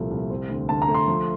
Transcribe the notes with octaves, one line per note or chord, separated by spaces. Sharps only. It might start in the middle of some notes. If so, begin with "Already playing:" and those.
Already playing: C2 A#2 F3 A3
C2
C4
D2
D2 A5
A#5
A3
C6
F3